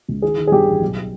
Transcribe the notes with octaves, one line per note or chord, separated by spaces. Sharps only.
C#2
D#3 G#4
D#3
G#4
G2 G4
A1
B1